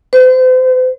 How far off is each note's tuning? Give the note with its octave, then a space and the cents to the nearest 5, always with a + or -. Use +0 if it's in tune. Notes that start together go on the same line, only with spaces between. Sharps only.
C5 -35